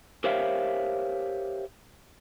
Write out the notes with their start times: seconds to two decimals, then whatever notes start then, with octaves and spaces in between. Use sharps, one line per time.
0.24 G4 A#4 C5 C#5 E5 F5